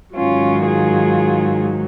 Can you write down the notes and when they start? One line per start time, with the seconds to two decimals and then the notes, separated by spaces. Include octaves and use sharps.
0.16 G#2 D#3 F#3 C#4 F4
0.66 F4 G#4